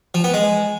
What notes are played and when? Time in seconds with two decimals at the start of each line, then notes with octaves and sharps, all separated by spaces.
0.14 F3
0.24 B3
0.34 G#3